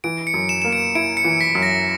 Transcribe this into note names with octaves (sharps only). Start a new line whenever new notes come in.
E3 D7
C#7
F#2
E7
A#3 E7
D7
E4 D7
C#7
E3
B6
F#2
A#6